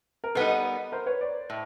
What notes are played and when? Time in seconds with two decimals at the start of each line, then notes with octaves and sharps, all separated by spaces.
0.24 A#4
0.35 G3 B3 D#4 A4 B4
0.92 A#4 C5
1.06 B4 C#5
1.21 C5 D5
1.50 A2